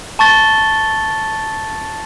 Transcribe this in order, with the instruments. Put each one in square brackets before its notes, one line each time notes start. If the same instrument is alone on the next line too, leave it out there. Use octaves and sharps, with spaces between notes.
[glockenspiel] A5 C#6 A6 G7